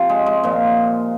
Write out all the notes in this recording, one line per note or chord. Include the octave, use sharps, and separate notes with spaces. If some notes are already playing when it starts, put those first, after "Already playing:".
Already playing: C3 F3
G#3
G#3
A#2 F3